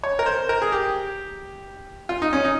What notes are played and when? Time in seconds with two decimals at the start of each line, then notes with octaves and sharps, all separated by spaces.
0.04 C#5
0.19 A#4
0.26 C5
0.49 A#4
0.62 G#4
0.72 G4
2.09 F4
2.22 D#4
2.33 C#4
2.44 D#4